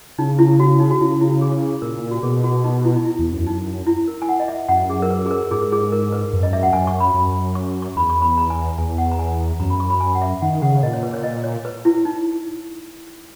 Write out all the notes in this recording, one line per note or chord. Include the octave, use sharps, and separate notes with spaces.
C#3 D#4
E4
F#4
D#4
F#4
C#3 E4
E4
G#4
A#2 A#4
F#4
B2 G#4
F#4
D#4
E4
D#4
E4
E2
F#2
D#4
E4
A#4
G#5
F#5
D#5
E5
F#2 F#5
G#4
A#4
B4
G#4
A#4
G#2 G#4
A#4
G#4
A#4
B4
F#2
D#5
E5
F#5
F#2 G#5
C#6
B5
F#2
C#6
C#6
E2 B5
C#6
B5
A#5
G#5
E2 G#5
F#5
A#5
G#5
F#2 A#5
B5
C#6
B5
G#5
F#5
E5
D#3 F#5
C#3 F#5
A#2 D#5
C#5
B4
C#5
D#5
C#5
B4
E4
D#4